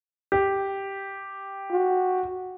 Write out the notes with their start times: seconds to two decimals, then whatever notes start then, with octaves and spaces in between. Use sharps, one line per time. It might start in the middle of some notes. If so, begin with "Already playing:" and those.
0.32 G4
1.71 F#4